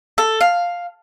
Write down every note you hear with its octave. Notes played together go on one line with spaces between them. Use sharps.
A4
F5